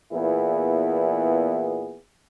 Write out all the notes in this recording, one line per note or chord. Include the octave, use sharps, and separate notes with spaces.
E2 A#2 B3 E4 G#4